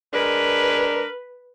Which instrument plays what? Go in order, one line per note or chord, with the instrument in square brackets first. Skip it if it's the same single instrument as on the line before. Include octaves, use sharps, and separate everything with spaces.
[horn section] G#3 D4 A#4 [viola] B4